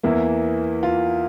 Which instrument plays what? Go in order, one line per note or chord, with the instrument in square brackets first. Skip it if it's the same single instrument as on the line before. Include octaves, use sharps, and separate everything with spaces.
[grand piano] E2 E3 A#3 E4
F4